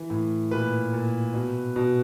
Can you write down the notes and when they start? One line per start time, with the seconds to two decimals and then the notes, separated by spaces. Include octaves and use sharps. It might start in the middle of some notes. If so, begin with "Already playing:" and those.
Already playing: E3
0.10 A2
0.51 A#2 B4
0.93 A#2
1.34 B2
1.76 B2